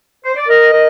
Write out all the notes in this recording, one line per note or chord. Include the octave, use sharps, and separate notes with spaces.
C5
D5
A#4 D#5
A#4